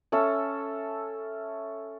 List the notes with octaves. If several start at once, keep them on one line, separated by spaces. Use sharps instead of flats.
C#4 A4 E5